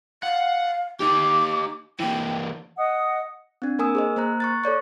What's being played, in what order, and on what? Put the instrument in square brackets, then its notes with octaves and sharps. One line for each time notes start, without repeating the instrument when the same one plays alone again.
[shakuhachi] F5 [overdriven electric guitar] F#5
[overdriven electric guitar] D#4 G4 [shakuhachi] D6
[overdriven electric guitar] E3 A#3 [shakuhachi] G5
[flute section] D#5 F#5 D#6
[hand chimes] C4 D4
A#3 A#4 G#5 D#6 E6
G#4 C5 D#5
A#3 C5 A#5 F#6
C#6 F#6 A6
A4 C#5 D5 C#6